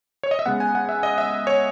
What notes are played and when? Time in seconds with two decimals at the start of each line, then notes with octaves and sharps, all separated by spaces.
0.23 C#5
0.31 D#5
0.39 E5
0.46 C#3 G#3 B3 F#5
0.60 G#5
0.75 F#5
0.89 E5
1.03 D#5
1.18 E5
1.47 C#5